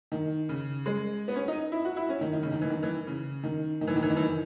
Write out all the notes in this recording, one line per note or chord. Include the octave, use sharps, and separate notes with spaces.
D#3
C#3
G#3
B3
C#4
D#4
E4
F#4
E4
C#4
D#3
D#3
C#3
D#3
E3
D#3
E3
C#3
D#3
D#3
E3
D#3
E3
D#3
E3
D#3